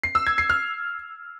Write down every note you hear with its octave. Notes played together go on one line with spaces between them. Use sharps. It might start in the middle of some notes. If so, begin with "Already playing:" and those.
C7
E6
G#6
C7
F6